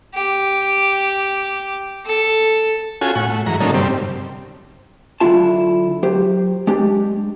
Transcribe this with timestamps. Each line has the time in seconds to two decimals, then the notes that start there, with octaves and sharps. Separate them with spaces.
0.14 G4
2.06 A4
3.01 C#4 F4 F#4 A4 G#5
3.15 A2 F#5 C#6
3.30 A3
3.46 G#2 E3 F#3 A#5
3.60 D3 F#3 A#3 C#4 D#4 A4
3.74 G2 C3 G3 C4
5.20 D3 F#3 G#3 E4 F4 A5
6.03 F#3 G4 C5
6.67 G#3 D4 G4